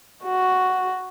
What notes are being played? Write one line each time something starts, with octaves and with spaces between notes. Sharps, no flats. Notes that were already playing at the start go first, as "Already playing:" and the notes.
F#4